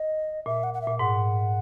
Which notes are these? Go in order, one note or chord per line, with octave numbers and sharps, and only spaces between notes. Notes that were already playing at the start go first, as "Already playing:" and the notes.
Already playing: D#5
A#2 E5
F#5
F#5
E5
A#2
G#2 F#5